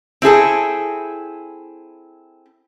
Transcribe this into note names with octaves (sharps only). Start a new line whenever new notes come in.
C4 E4 G#4 A4